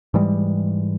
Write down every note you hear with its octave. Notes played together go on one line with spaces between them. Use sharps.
G#2 E3 G3 G#3